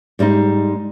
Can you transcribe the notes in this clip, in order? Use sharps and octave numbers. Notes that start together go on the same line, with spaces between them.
G#2 G3 G#3 D#4